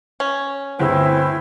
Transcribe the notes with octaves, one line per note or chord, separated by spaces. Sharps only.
C#4
G1 D2 C4 E4 G#4